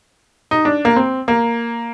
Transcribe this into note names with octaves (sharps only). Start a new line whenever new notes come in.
D#4
D4
A#3
C4
A#3